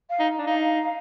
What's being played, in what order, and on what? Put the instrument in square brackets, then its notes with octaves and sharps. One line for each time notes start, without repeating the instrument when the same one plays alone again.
[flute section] F5
[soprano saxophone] D#4
D4
[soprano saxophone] D#4 [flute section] F5